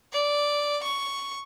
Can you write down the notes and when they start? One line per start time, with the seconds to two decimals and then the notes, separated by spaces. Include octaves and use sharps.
0.12 D5
0.83 C#6